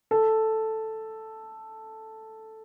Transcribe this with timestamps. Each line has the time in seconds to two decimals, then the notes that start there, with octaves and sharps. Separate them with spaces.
0.11 A4